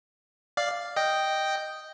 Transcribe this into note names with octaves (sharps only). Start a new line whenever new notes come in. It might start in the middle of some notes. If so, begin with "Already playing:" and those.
D5 F5
D#5 G5